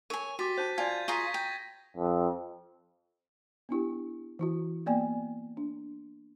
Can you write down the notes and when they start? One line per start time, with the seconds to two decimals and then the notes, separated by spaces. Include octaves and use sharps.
0.10 A#4 C#5 G#5 D#7
0.39 F#4 G4 D6 A6 B6 D#7
0.58 C5 A5 G6
0.78 F4 D5 G#5 A5 G#6
1.08 F4 G#4 A#5 C#6 A#6 B6
1.34 G5
1.97 F2
3.69 B3 D4 E4 G4
4.39 E3 E4 F#4
4.86 A#3 B3 D5 G5 G#5
5.57 D4